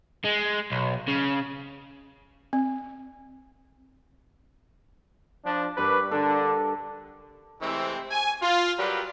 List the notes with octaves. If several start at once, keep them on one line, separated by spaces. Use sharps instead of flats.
G#3
B1
C#3
C4
F3 D4
G2 D4 A#4 B4 C#6 D6
D3 D4 A4 A#4
C3 E3 G#3 A3 C4
G#5
F4
F#3 G3 F#4 G4 A#4 B4